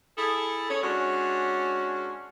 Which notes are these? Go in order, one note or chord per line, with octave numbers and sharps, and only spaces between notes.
E4 G#4 A4
C#4 G#4 C#5
G#3 C#4 D4 F#4